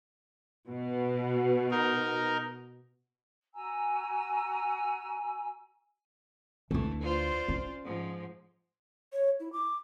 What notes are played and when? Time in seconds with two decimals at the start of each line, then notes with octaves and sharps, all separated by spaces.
0.69 B2
1.71 D#4 A#4
3.54 F#4 G#5 A#5 E6
6.71 D2 E3 A3 D4
7.02 F4 C5 D5
7.48 C#4
7.84 G#2 F3
9.13 C#5
9.40 E4
9.53 D6